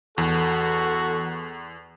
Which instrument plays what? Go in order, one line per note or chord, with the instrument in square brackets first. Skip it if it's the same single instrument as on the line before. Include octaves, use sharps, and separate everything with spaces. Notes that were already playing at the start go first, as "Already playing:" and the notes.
[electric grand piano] E2 [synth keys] E3 [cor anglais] F#4 [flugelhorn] A4